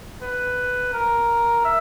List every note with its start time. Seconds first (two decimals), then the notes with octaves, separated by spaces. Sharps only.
0.21 B4
0.93 A#4
1.65 E5